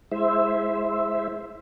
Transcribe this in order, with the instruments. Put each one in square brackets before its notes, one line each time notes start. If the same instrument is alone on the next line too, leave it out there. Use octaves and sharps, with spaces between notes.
[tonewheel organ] G#3 E4 C5 E5